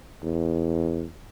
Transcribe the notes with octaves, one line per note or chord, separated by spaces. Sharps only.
E2